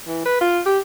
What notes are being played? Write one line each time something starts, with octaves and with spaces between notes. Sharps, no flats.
E3
B4
F4
G4